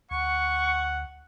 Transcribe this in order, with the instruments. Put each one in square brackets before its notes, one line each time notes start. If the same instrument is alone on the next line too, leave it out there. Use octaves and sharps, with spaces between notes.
[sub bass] D2 [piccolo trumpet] F#5 [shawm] C#6